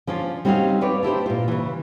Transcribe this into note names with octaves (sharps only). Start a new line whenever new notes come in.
F3 C#4 D4 F4
G3 C4 C#4 D#4 F#4 F5
B4 C#5 D5
D4 E4 G4 C5
A#2 F4
C#3 E3